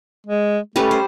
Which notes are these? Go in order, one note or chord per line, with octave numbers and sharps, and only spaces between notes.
G#3
G3 A3 C#4 B4
C5